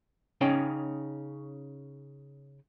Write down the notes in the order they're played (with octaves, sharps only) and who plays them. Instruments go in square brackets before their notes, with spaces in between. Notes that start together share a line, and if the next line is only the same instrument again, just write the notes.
[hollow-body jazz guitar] C#3 C#4 D#4 C#5 G5